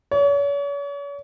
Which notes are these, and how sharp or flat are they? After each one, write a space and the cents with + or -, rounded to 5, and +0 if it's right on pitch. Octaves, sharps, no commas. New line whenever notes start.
C#5 +40